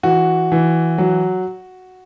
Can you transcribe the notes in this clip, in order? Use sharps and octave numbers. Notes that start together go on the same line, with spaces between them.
E3 F#4
E3
F#3